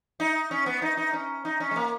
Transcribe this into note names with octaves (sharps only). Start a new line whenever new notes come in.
D#4
C#4
B3
D#4
D#4
C#4
D#4
C#4
G#3
A#3